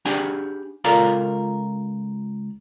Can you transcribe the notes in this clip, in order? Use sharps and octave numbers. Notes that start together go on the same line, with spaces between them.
D4 G4 G#4 F#5 G#5
C#2 F4 A4 A#4 D5 F5